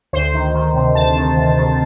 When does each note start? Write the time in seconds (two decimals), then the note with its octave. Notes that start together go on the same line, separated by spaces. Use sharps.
0.13 D2 C5
0.34 D#3
0.55 D#3
0.74 C3
0.95 D2 A5
1.16 D#3
1.36 D2
1.57 D#3